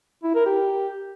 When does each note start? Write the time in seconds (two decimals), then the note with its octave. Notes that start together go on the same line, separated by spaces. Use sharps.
0.24 E4
0.35 A#4
0.46 G4